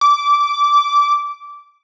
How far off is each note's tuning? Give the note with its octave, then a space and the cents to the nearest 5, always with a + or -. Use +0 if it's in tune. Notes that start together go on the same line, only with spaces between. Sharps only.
D6 -15